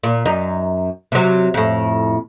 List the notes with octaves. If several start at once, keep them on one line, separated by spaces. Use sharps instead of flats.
A#2
F#2 D#4
C3 F#3
F2 A2